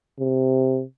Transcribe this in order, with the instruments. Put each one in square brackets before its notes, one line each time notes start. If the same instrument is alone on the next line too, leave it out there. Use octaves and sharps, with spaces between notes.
[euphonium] C3